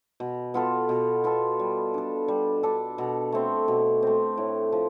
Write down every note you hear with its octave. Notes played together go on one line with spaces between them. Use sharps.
B2
B3 F4 A4
B2
B3 F4 A4
G3
D4 A4
G3
D4 A4
B2
A3 C4
B2
A3 C4
A2
F3